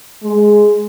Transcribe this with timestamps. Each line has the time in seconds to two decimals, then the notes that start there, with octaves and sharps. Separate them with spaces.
0.23 G#3